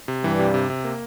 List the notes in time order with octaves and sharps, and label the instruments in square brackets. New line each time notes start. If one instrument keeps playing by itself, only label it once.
[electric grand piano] C3
[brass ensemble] G2 G3 [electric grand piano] E3
[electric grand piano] C3
C3
C3
A#3